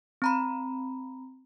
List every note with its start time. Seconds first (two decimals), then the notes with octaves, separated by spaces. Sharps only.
0.22 C4 A#5 B5